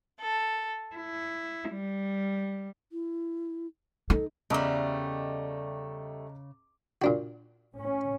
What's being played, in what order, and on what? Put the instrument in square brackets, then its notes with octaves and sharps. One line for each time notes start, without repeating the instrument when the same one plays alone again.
[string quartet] A4
E4
G3
[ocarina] E4
[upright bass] D#4 [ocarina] A4
[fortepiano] E2 [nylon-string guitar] C#3 [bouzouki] G3 A3 [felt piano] D#5 A#5 D6
[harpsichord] A#2 D4 F#4
[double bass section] A2 C#4